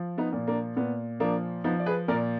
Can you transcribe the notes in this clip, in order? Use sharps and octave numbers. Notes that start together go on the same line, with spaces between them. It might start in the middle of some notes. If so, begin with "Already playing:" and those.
Already playing: F3
B3 D#4
A#2
A#3 D4
A#2 B3
F3 A#3 D4
F3 B3 D#4
D5
G#4 B4
A#2 A#4 D5